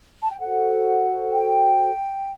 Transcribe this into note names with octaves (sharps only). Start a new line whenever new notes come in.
A5
G5
F#4 A4 C5 F#5
G5